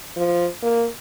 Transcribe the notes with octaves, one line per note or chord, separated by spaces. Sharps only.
F3
A#3